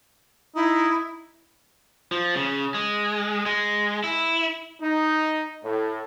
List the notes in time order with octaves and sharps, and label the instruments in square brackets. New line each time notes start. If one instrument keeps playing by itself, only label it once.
[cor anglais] D#4 [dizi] E4
[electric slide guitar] F3
C#3
G#3
G#3
E4
[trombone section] D#4
A2